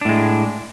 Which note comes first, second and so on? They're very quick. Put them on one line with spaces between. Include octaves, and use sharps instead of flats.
D4 A2 G#3